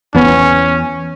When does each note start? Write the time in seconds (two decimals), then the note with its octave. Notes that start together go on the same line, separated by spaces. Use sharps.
0.15 E2 B3 C#4